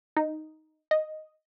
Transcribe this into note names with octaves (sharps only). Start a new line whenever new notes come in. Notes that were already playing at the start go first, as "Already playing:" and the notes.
D#4
D#5